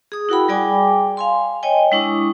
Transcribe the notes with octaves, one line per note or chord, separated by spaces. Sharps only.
G#4 D#6
E4 F#4 A#4 F#5 G5 B5
G3 G#4 D5 G5 G#5 D6
F5 G#5 C6
C#5 D#5 G5 G#5
G#3 D4 E4 C#6 D#6